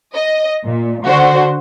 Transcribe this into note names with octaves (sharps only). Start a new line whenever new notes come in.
D#5
A#2
D3 F#4 C5